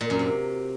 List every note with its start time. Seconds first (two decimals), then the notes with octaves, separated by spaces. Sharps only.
0.01 A#2
0.10 F#2
0.19 C3